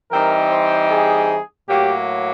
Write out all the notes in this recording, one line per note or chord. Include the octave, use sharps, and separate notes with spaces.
E3 G3 C4 D#4 A#4
C5
G#4
A2 F#3 A#3 G4